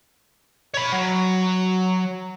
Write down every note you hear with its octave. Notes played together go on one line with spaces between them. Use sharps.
C#5 B5
F#3